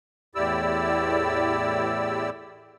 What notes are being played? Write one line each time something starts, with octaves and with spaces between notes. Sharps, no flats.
E2 A2 E4 G4 D5 E6